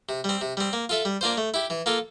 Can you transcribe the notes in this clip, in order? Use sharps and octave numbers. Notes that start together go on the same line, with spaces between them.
C3
G3 C4
C3
G3 C4
A#3
F4 A4 E5
G3
A#3 D4 F4 C5
A3
E4 G4
E3
A#3 F4 A4